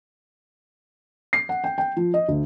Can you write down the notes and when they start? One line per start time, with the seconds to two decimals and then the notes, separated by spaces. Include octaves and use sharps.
1.33 C7
1.49 F#5
1.64 G5
1.78 G5
1.96 F3
2.14 D#5
2.28 D2